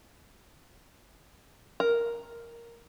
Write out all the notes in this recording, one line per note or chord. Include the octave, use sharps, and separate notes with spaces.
A#4